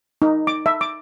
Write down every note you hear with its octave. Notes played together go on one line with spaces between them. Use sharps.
D#4
D6
E5
D6